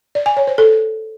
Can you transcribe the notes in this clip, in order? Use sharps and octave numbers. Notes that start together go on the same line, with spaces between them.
D5
G#5
C#5
C5
A4